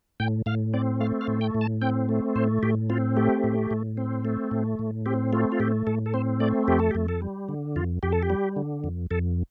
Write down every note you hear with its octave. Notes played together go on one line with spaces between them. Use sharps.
A2 G5
A2 F5
C4 D5
A3 F5
F5
A2
G5
A2
A5
C4 G5
A3
A2 C5
A2 G4
C4 F4
A3 G4
A2
A2
C4
A3
A2
A2
C4 G4
A3 F4
F4
A2 G4
A2 A4
A4
C4 C5
A3 D5
F2 G4
A4
G4
F2
A4
G3
D3
F2 F4
F2 G4
A4
G4
G3
D3
F2
F2 A4